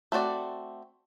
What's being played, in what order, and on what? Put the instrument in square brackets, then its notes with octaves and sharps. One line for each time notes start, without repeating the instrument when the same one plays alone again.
[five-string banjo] A3 C4 F#4 D5